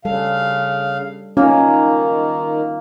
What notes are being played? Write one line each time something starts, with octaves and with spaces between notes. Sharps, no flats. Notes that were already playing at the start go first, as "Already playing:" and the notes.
C#3 G3 A4 F5
D#3 A#3 C#4 D#4 F4